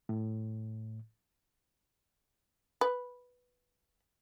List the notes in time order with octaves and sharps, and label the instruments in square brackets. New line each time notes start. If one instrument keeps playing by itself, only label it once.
[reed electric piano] A2
[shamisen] B4